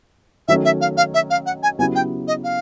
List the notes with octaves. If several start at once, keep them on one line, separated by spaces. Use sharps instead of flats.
D#3 F#3 A3 C#4 E5
E5
F5
F5
E5
F5
F#5
G#5
C#3 F#3 B3 E4 G4 G#5
G5
D#5
F5